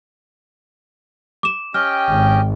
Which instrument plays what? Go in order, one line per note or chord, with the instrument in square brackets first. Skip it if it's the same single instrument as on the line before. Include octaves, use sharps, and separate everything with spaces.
[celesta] D6 E7
[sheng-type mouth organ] C#4 G4 D#5 [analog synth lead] G5 [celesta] F6
[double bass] G#1